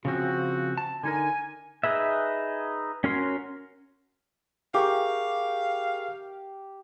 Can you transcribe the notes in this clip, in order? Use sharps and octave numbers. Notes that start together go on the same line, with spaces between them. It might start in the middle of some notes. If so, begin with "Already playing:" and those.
C#3 F3 C4 F#4
A5
D3 D#4 A#4 G#5
D#4 G#4 B4 E5
C#4 F#4 A#4 C#5 C6
G4 G#4 A#4 F5 C#6